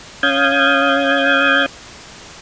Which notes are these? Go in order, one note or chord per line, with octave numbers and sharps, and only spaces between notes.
C#4 F5 D#6 G6 G#6